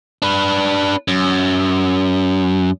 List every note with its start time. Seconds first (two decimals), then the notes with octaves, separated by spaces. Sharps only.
0.22 D4 B4
1.08 F#2